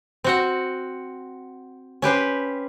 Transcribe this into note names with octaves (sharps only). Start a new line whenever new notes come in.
C4 F#4 F#5
C#4 G4 B4 C5